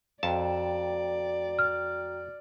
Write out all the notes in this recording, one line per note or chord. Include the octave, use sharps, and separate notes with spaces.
F2 F#4 D5 G5 A5 A#5
F6